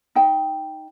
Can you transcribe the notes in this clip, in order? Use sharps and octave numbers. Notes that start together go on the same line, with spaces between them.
D#4 G5